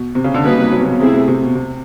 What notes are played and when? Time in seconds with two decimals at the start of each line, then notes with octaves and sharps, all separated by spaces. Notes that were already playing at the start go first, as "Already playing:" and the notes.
Already playing: B2
0.15 C3
0.24 C#3
0.34 D3
0.44 C#3 G3 A#3 D#4 F#4 B4
0.58 C3
0.72 F#3
0.81 C3
0.91 B2
0.99 C3 A3 C4 E4 G#4
1.13 C3
1.28 C3
1.42 B2
1.55 C3